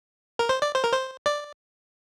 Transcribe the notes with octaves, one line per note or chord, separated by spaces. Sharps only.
A#4
C5
D5
C5
A#4
C5
D5